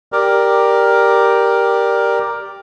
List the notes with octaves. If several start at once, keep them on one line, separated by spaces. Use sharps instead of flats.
G4 A#4 D5